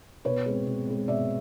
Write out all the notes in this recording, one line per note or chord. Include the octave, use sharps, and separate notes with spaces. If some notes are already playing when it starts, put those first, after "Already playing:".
B2 B4 C#5
G#3 C4
B2
G#3 C4
B2 D5 E5